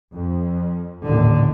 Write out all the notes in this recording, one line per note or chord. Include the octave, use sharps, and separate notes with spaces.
F2
A1 D#2 A#2 D3